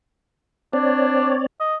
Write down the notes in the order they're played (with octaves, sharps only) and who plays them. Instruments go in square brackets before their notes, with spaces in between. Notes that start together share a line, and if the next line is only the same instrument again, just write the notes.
[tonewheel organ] C4 C#5 D5 [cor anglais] D4
[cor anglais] D#5